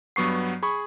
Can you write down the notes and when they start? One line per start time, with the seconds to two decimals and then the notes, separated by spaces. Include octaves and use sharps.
0.16 G2 F#3 B3 C#6 C7
0.63 G#4 B5 C#6